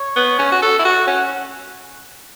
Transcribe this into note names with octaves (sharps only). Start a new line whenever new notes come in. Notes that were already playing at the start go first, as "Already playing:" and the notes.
Already playing: C#5
B3
C#4
F#4
A4
E4
F#4
C#4 F#5